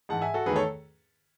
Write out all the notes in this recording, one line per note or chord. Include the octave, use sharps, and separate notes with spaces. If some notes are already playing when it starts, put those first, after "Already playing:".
G#2 E3 G#3 F#5 A5
E5 G#5
F#4 A4
E2 D#3 A3 G#4 B4
A4 C#5